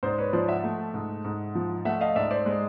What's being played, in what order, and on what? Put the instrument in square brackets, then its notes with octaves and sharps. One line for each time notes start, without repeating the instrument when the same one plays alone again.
[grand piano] G#2 C5 D5
B4 C#5
F3 C5 D5
E5 F#5
A3
G#2
G#2
F3
A3 E5 F#5
D#5 F5
G#2 D5 E5
C5 D5
G#3